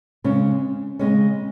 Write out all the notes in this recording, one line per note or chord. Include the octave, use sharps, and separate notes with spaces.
C#3 G#3 C#4
C#3 G#3 C#4